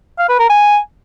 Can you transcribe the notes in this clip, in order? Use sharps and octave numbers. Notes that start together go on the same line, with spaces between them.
F5
B4
A#4
G#5